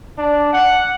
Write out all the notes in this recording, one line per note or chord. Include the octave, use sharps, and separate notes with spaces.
D4
F#5